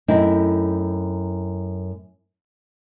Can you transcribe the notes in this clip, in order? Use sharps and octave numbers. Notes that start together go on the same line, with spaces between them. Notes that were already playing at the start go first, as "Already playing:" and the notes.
F#2 A3 C4 D#4 E4